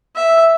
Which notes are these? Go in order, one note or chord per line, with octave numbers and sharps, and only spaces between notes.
E5